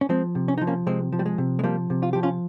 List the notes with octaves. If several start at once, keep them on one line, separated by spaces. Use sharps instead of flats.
C#4
F3 G#3 C4
C3
C#4
F3 D#4
A#3 C#4
C3 G#3 C4
F3
G3
G#3
C3
G#3
F3 G3 A#3
C3
F4
F3 G4
C#4 F4